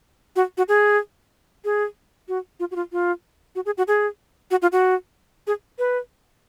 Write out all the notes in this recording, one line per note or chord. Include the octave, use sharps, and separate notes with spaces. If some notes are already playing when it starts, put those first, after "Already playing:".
F#4
F#4
G#4
G#4
F#4
F4
F#4
F4
F4
F#4
G#4
F#4
G#4
F#4
F4
F#4
G#4
B4